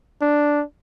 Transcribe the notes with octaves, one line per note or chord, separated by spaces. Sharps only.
D4